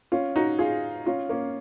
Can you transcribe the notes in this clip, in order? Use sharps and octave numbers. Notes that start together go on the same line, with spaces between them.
C#4 F4
D#4 F#4
F4 G#4
C#4 F4
A#3 C#4